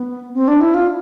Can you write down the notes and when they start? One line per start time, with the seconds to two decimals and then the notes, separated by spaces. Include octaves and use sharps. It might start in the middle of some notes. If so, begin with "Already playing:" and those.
Already playing: B3
0.34 C4
0.48 D4
0.61 E4
0.74 F4